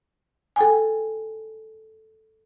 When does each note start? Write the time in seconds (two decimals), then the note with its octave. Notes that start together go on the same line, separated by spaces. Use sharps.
0.56 A4 G5 G#5